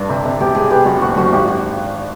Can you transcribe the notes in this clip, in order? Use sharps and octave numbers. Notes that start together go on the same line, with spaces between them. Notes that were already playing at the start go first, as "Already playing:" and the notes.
Already playing: G2 D4
C3
C3
E1 G4
E1 G#4
B3 G4
F#2 F#4
F#1 F#4
F#1 F#4
G#1 G4
F#4